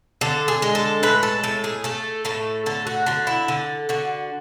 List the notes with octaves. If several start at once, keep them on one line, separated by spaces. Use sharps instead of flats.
D3 A4
G#4
G#3
A4
A2 B4
A4
A2 A4
G#4
A3 A4
A2 A4
D3 A4
F#4
D3 F#4
E4
D3 A4
D3 F#4